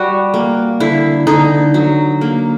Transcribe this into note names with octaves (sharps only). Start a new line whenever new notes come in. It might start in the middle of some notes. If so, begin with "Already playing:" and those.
Already playing: G3 F#4
A#3
D3 E4
D3 D#4
F#3
A#3